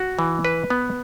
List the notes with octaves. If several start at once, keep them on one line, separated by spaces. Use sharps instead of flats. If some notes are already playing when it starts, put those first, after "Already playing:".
Already playing: F#4
E3
B4
B3